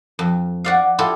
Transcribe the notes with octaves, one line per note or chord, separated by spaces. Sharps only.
F2
F#4 D5 F5
E4 F4 G4 A4